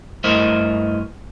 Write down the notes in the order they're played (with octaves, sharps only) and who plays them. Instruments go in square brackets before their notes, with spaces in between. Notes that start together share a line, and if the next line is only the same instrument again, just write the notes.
[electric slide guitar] G2 A3 E4 A#4 C5 D#5